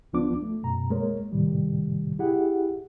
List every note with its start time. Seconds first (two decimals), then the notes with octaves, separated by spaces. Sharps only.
0.13 C#2 F3 B3 D4 F4 D6
0.42 A3
0.63 F#2 B2 A#5
0.90 G#3 A#3 A#4 C#5
1.32 C#2 A2 C3 D#3 G3
2.19 E4 G4 G#4 F#5